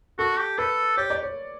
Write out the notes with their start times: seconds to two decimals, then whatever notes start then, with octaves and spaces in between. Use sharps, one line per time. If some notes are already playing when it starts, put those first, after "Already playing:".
0.18 F#4 A4
0.38 G4
0.58 A4 B4
0.97 G4 C#5
1.10 D5
1.23 C#5